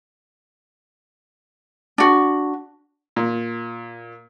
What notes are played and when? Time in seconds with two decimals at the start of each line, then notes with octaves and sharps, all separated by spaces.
1.98 D4 F#4
3.16 A#2